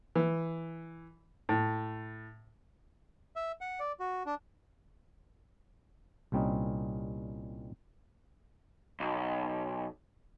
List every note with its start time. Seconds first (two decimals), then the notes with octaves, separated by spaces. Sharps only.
0.16 E3
1.49 A2
3.36 E5
3.61 F#5
3.80 D5
4.00 F#4
4.26 D4
6.32 C2 A#2 G3 C4 C#4 D#4
9.00 B1